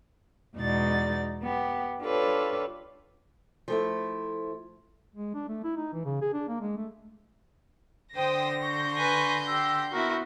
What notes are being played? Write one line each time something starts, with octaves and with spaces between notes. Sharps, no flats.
E2 B2 G#3 D#4 D5 A6
B3 G4
D4 F4 G4 A4 B4 C#5
F3 A3 E4
G#3
D4
A3
E4
D#4
E3
C#3
G#4
D4
A#3
G#3
A3
D3 C5 G5 D#6 A#6
C6 C#6 G6
B4 G#5
G4 E6
B3 E4 F#4 A#4